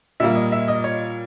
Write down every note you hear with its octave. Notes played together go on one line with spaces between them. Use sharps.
A#2 G3 A#3 E5
D#5
E5
D#5
C#5